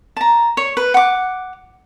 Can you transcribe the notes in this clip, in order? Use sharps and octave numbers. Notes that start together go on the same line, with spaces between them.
A5 A#5
C#5
B4
F#5 D6